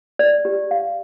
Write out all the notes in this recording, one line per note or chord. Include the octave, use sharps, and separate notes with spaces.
D5
G4
F5